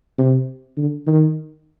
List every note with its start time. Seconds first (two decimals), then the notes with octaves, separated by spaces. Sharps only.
0.18 C3
0.78 D3
1.07 D#3